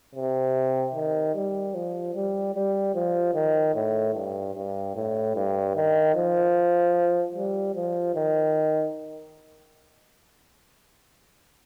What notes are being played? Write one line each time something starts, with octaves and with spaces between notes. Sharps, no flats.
C3
D#3
G3
F3
G3
G3
F3
D#3
A2
G2
G2
A2
G2
D#3
F3
G3
F3
D#3